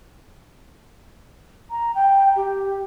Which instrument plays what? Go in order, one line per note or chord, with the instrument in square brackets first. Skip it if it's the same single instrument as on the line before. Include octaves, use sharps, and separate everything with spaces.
[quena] A#5
G5
G4